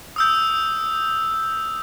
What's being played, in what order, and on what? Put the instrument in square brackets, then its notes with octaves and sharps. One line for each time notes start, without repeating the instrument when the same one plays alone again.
[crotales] D#6 E6 G6